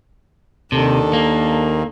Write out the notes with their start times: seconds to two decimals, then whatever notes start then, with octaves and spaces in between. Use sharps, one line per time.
0.72 D#2 C3 D4 A4
1.13 A#3